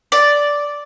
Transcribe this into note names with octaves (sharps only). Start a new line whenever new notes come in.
D5